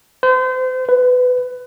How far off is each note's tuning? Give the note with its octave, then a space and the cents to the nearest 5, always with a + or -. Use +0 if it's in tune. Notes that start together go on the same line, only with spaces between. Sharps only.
C5 -35
B4 +20